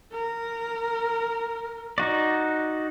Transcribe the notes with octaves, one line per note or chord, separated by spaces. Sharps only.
A#4
D#4 F#4 D5